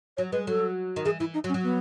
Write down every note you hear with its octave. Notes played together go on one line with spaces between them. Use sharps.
F#3 C#5
G#3 B4
F#3 A4
D#3
E3 G#4
E3 E4
D#4
F#3
C#4
F#3
B3